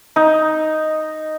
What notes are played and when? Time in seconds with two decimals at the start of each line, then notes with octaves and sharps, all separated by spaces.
0.16 D#4